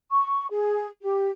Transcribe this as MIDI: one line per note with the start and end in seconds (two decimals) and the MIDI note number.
0.10 0.46 85
0.50 0.87 68
1.02 1.29 67